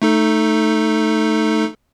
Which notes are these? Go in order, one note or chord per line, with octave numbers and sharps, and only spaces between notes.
A3 D#4 A4